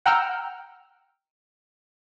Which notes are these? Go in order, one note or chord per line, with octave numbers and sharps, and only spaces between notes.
F#5 G5 A#5 E6 F6 G6